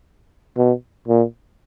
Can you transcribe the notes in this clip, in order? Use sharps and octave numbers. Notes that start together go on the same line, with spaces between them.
B2
A#2